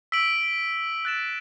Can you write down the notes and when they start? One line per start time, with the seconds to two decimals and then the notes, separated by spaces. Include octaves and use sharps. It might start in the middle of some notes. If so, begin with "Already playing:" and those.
0.12 E6 B6 D7 F#7
1.05 F#6 A6 E7